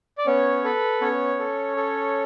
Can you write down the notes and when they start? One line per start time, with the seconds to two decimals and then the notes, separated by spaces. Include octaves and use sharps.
0.18 D5
0.26 B3 C#4 C#5
0.64 A4 B4
1.01 B3 C#4 C#5
1.39 A4
1.77 A4